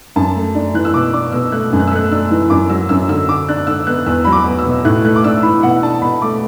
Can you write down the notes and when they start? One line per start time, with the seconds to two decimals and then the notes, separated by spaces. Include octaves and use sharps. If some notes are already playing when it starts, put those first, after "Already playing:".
0.16 F#2 A5
0.35 A3
0.55 D4
0.74 E3 F#6
0.85 E6
0.94 B2 D6
1.13 D4 D6
1.32 B2 E6
1.52 A3 F#6
1.73 F#2
1.80 F#6
1.88 E6
1.91 A3 F#6
2.11 D4 E6
2.31 E3
2.50 F#2 D6
2.69 F#3 E6
2.89 F#2 E6
3.08 D3 E6
3.28 D3 D6
3.48 D4 F#6
3.67 D3 E6
3.87 B3 F#6
4.06 E2 E6
4.25 F#3 B5
4.32 D6
4.45 B3
4.59 E6
4.65 B2
4.85 A2 F#6
5.05 A3 F#6
5.16 D6
5.24 D4 E6
5.43 E3 B5
5.63 B2 F#5
5.83 D4 A5
6.02 B2 B5
6.22 A3 D6